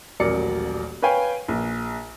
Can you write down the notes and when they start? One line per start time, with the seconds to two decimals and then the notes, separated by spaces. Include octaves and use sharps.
0.20 D#1 A1 F#3 A#4 D5 C#7
1.02 B4 C#5 F5 G5 G#5
1.49 A#1